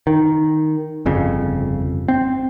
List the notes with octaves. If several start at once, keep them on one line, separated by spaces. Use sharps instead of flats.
D#3
G1 F2 C#3
C4